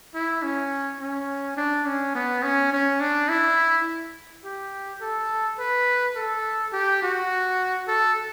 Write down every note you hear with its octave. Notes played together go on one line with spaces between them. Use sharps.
E4
C#4
C#4
D4
C#4
B3
C#4
C#4
D4
E4
G4
A4
B4
A4
G4
F#4
A4